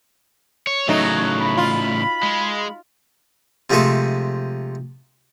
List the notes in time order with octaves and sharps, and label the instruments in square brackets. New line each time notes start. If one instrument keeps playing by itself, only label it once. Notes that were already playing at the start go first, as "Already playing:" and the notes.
[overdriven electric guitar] C#5
[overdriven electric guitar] A2 C#3 [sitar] F#3 A3 D#4
[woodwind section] B5
[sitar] F4
[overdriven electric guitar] G#3
[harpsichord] C3 F3 G#3 A3 G#4 A4